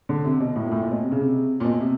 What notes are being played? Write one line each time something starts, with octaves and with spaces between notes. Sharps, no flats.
D3
C3
B2
A2
A#2
A2
A#2
B2
C3
C#3
C3
A#2
B2
C3